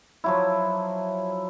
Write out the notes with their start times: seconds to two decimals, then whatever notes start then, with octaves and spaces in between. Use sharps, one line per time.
0.24 F3 F#3 E4